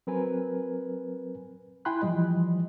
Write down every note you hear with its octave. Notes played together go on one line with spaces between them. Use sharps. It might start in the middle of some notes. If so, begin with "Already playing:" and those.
F#3 C4 A#4 B4 G#5
E4 G5 G#5 B5 C6 F#6
E3 F3 G3 D#5